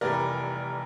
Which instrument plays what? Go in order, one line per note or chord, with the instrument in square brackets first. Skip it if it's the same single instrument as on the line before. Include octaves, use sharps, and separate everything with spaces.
[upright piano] F1 F2 E3 G3 A#4 D5